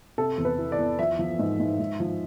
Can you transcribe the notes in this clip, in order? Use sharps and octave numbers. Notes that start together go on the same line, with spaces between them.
C3 A4
E2
B4
E3
D5
E2
F3 E5
F3
G#2
G#2
G#2
F3